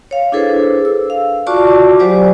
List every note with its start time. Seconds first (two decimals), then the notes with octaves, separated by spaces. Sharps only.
0.11 C#5 F5
0.32 D4 E4 G#4 A4 B4 C5
0.85 E6
1.10 F5
1.47 F4 F#4 D5 A5 C#6 D6
1.99 F#3 G4 C5 D5 G#5